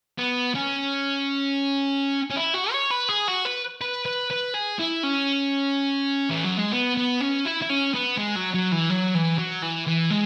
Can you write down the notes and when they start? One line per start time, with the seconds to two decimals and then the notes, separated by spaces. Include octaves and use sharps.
0.19 B3
0.55 C#4
2.30 C#4
2.36 E4
2.54 F#4
2.72 C#5
2.91 B4
3.09 G#4
3.28 F#4
3.45 B4
3.82 B4
4.05 B4
4.30 B4
4.54 G#4
4.79 E4
5.03 C#4
6.31 E3
6.44 F#3
6.58 G#3
6.73 B3
6.97 B3
7.20 C#4
7.45 E4
7.62 E4
7.69 C#4
7.94 B3
8.17 G#3
8.35 F#3
8.54 F#3
8.72 E3
8.90 F#3
9.15 E3
9.38 F#3
9.62 E3
9.87 E3
10.10 G#3